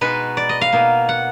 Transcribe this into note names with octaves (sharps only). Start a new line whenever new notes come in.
B2 G#3 D#4 B4
D5
D#5
F5
B2 A#3 D#4
F#5